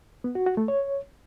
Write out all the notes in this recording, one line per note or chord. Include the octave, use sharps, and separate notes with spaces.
B3
F#4
F#4
A3
C#5